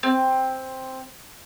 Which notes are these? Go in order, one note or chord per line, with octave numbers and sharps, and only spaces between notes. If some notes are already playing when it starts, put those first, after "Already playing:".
C4